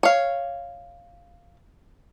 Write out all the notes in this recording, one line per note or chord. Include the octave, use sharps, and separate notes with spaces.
C#5 F5